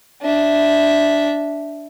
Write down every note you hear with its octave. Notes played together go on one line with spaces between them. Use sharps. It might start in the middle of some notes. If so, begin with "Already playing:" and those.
D4 E5